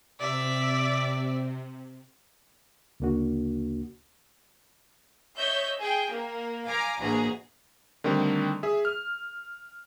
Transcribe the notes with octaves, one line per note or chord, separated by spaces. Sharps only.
C3 D5 E5
D2 C#3 A#3 D4 F#4
C#5 D#5 E5 G6
G#4 G5
A#3
F5 G#5 A#5 D6
A1 D2 B2 A#3 G#4 A#5
D3 D#3 G3 A3 C4 D4
G#4 E5
F6